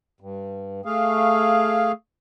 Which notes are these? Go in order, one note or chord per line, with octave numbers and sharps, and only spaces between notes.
G2
A3 G#4 F5